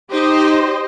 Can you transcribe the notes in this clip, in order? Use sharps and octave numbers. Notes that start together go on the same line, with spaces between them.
D#4 G4 C5 D#5